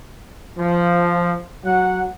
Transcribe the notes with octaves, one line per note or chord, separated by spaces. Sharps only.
F3
F#3 F#5